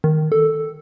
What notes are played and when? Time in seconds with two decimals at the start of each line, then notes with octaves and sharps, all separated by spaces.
0.04 D#3
0.32 A4